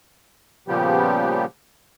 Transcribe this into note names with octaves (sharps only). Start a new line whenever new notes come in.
A#2 C#3 F3 G3 B3 G4